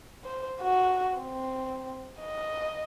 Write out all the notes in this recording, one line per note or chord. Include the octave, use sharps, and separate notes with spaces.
C5
F#4
C4
D#5